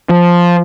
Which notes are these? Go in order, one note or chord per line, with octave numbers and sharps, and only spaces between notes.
F3